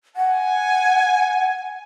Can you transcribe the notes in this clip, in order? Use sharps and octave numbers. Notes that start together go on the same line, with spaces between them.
F#5 G#5